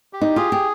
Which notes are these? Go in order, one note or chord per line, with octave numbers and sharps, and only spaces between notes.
G4
D#4
F4 G#4
G4